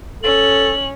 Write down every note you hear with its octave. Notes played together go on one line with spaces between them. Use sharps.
C#4 A4 F#7